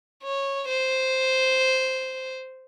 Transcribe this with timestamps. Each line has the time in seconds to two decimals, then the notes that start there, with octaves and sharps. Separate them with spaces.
0.24 C#5
0.68 C5